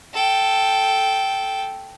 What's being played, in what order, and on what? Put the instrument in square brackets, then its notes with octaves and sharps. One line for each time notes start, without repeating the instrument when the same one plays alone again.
[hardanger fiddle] A4 G5